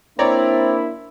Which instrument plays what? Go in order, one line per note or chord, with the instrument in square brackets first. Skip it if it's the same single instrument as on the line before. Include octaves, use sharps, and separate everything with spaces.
[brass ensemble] A#3 D4 E4 [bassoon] C4 [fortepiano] C#5 D5 A#5